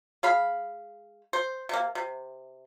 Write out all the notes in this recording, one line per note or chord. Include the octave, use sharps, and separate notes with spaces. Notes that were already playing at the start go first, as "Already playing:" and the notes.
G#3 F5 B5
C5
C3 A#3
C3